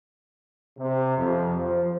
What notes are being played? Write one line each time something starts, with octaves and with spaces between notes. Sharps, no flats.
C3
F2
F3